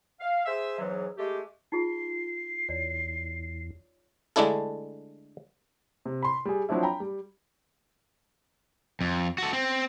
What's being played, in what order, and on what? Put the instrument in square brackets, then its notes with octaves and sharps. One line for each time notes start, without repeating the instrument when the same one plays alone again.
[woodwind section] F5
G#4 C5 E5
E2 G#2 E3 F#3
G#3 A3 G4
[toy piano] D#4 F4 G#4 [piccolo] C7
[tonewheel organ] E2 [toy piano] C#5 D5
[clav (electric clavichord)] D3 G#3 A3 D4 E4 A4
[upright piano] C3
B5 C6
G3 G#4
F3 F#3 C4 D4 E4
G5 A#5 B5
G3
[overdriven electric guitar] F2
F#4 A4
C4